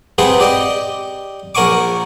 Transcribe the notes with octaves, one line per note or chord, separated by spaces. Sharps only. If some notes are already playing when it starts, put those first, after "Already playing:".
C3 G#4 B4 C5 F#5 G5
G4 D5 D#5 G5
A#1 A#4 F#5 G#5 C#6 D6